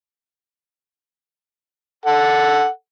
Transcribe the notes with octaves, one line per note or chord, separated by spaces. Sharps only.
A4 F#5